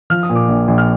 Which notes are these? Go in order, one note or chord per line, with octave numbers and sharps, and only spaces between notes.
F3 F6
D#6
A#2
D6
A#1
A#1
F6